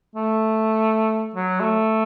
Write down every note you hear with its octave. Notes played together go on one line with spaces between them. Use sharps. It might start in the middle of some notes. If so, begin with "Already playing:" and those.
A3
F#3
A3